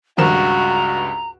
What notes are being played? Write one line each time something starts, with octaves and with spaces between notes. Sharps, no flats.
C#2 G2 D#3 F3 F#4 A#5 E7